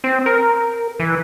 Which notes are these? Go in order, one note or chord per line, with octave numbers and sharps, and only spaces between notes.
C4
A#4
E3